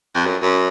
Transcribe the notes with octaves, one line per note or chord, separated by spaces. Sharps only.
F2
F#2
F#2